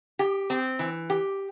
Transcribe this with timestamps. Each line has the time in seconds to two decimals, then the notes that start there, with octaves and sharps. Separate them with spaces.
0.19 G4
0.50 C4
0.79 E3
1.10 G4